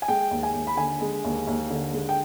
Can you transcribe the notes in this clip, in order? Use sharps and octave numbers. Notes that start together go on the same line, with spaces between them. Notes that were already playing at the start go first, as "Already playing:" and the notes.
G#5
G#3 G5
D#2
G#5
D#2
B5
D3 G#5
G#3
D#2
D#2
D3
G#3
G5